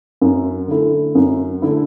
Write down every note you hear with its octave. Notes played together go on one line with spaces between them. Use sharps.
F#2
D3 A3 E4
F#2
D3 A3 E4